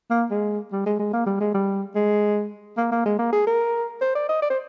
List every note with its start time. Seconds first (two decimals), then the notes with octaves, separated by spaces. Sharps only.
0.10 A#3
0.31 G#3
0.72 G3
0.86 G#3
0.99 G#3
1.13 A#3
1.27 G3
1.40 G#3
1.54 G3
1.95 G#3
2.77 A#3
2.92 A#3
3.06 G#3
3.19 A#3
3.33 G#4
3.47 A#4
4.01 C5
4.15 D5
4.29 D#5
4.42 D5
4.50 C5